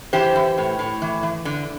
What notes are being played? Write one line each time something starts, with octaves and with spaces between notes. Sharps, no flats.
E3 G4 C5
E3
A2
A2
E3
E3
D3